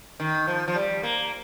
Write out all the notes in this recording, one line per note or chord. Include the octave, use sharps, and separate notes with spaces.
D#3
F3
F3
G3
A#3